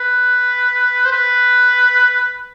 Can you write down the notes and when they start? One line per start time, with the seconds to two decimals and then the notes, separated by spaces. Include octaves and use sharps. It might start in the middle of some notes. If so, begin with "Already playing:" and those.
Already playing: B4
1.06 C5
1.11 B4